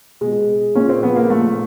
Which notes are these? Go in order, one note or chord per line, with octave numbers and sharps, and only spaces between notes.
B2 G#3
A#2 C#4
C4
F3 B3
A#3
A#2 A3